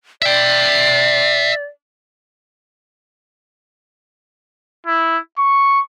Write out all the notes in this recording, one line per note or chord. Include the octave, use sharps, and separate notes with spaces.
D5 E5 G5
E4
C#6